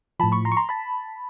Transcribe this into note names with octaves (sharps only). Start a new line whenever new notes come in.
A2 F3 A5 B5
B5 C#6
A#5 C6
C#6
A#5 C6
A5 B5